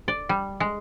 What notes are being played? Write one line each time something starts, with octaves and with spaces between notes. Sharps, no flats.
D5
G3
G#3